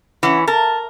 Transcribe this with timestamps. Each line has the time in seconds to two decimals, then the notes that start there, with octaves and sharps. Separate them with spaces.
0.23 E3 C#4 F#5
0.48 A#4 A5